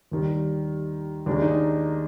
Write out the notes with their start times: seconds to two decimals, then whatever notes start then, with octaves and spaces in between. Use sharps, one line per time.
0.11 D#2 D#3 G3
1.26 D#2 D#3 G#3 D4
1.42 D#4